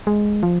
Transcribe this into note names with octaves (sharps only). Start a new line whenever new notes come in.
G#3
F3